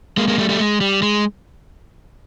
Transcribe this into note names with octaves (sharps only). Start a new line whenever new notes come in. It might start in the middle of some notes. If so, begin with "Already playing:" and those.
G#3 A#3
G#3 A#3
G3 A3
G3 A3
G#3
G3
G#3